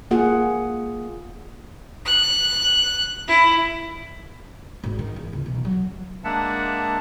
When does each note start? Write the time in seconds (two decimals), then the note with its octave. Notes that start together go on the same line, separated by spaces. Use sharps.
0.11 A#3 F4 G#4 F#5
2.06 F#6
3.28 E4
4.84 G#1
4.99 D#3
5.16 E2
5.33 C#2
5.46 B1
5.65 F#3
6.24 G#3 A#3 D4 E5 F#5 A5